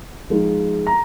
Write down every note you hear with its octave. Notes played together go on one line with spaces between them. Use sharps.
F3 G#3 D#4
A#5